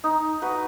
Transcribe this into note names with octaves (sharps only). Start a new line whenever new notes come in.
D#4
F#4 B4